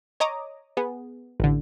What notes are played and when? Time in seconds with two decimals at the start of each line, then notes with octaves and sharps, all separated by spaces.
0.20 C#5 D#5 A#5 D6 D#6
0.77 B3 G#4
1.40 A1 D3